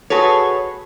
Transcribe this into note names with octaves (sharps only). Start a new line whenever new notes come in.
F#4 G#4 A4 B4 C#5